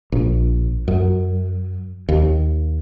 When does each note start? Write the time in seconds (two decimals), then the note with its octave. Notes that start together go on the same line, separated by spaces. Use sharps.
0.12 A#1
0.88 F#2
2.09 D#2